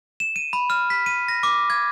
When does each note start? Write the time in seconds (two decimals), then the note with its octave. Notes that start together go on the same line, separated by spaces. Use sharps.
0.20 E7
0.36 D#7
0.53 B5
0.70 F6
0.90 B6
1.06 D#7
1.28 A#6
1.43 D6
1.70 G#6